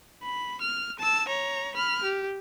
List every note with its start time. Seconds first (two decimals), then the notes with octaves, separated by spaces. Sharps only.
0.23 B5
0.61 F6
0.99 A5 E6
1.28 C#5 A#5
1.75 B5 F6
2.03 G4